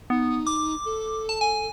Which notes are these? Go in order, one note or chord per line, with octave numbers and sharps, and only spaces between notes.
B3 D#4
D6
A4
A5
G#5